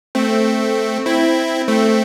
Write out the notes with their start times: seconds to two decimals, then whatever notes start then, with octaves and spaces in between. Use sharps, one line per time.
0.15 A3 C4
1.06 C4 E4
1.67 A3 C4